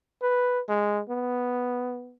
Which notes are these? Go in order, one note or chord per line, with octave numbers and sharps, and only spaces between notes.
B4
G#3
B3